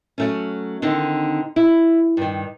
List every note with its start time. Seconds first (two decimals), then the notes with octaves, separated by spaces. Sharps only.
0.18 F#3 A3 C#4
0.82 D3 D#3 C4 D#4
1.56 E4
2.17 G2 D#3